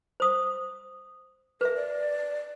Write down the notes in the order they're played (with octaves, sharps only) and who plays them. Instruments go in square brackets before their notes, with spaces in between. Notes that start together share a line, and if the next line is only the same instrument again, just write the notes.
[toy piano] C5 D#6
[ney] A#4 [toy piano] B4 E5
[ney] D5